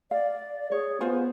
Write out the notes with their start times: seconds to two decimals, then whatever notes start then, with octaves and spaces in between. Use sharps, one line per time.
0.11 D5 F5
0.72 G#4 C#5
1.01 B3 F4 C5 G#5